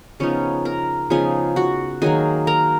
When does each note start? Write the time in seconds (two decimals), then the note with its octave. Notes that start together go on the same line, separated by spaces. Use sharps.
0.20 C#3 F3 B3 C#4 D#4 C#5
0.65 A#4 A#5
1.10 C#3 F3 B3 D#4 G#4 G#5
1.56 F#4 F#5
2.02 D#3 F#3 A#3 G#4 G#5
2.47 A#4 A#5